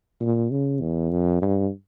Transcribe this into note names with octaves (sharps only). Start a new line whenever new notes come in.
A#2
C#3
E2
F2
G2